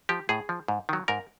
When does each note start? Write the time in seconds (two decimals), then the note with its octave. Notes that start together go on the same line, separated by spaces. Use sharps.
0.09 F3 G4
0.29 A2 G#4
0.49 F3
0.68 G#2
0.89 D#3 F#3
1.08 G#2 A#4